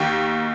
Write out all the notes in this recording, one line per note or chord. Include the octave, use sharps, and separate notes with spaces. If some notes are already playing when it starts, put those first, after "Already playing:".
Already playing: D#2 D#3 G4